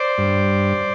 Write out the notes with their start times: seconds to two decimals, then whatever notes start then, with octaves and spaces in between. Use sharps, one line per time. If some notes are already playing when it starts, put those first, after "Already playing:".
Already playing: C5 D5
0.18 G2